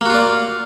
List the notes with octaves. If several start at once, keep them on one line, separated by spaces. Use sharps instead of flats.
A#3 F4 F#4 D5